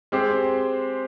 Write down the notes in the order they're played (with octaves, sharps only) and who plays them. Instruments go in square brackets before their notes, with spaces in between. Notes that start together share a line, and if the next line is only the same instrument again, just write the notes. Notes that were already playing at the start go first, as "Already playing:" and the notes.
[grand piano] G#3 C4 G4 C5